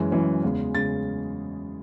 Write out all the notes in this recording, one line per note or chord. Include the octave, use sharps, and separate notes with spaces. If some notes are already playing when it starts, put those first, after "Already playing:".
Already playing: F#2 E3 G#3 C#4
F#2 E3 G#3 C#4
E2 C#3 G#3
C#3 G#3 A6